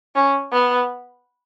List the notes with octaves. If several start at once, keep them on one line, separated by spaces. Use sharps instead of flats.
C#4
B3